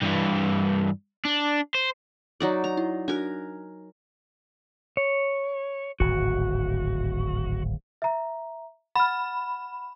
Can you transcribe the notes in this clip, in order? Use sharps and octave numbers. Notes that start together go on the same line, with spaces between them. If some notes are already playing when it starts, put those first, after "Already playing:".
G2 E3
D4
C5
F#3 D#4 D5
A#5
E4
D4 F#4 A#4 G#5 F#6
C#5
D1 G#1 F#4
E5 A#5
F#5 B5 F6